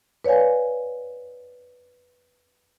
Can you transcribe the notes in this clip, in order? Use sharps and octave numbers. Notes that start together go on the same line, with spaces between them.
B4 C#5 D5 F5 G#5